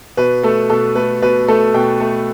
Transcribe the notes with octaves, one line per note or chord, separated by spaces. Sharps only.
B2 B4
A3 A4
B2 A4
A3 B4
B2 B4
A3 A4
B2 G5
A3